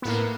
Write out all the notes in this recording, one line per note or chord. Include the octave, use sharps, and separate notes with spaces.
A2 A#3 B3